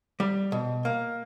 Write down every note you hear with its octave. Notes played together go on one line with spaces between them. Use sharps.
G3
B2
A#3